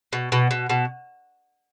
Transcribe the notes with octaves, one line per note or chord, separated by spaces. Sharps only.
B2
B2
B2
B2